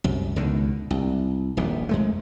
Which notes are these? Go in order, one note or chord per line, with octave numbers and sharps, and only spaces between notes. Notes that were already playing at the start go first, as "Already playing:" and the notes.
C2 F#2
C#2 B2 D3 D#3
C2
D#1 A#1 G#2
F2 G#3 A3